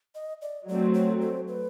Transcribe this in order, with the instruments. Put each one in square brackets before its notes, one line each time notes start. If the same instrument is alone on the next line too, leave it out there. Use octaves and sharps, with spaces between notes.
[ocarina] D#5
D5
[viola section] F#3 A3 C4 [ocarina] D5
[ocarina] C#5
C5
B4